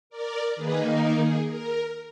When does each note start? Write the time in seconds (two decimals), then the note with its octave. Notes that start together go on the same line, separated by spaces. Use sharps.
0.10 A#4 D5
0.55 D#3 A#3 D#4 G#4 B4
0.86 A#4
1.16 G#4
1.46 A#4